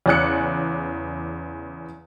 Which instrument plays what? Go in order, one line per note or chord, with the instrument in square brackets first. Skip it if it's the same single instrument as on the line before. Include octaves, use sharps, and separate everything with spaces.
[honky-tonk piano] E2 C#3 D5 G#5 F#6 C#7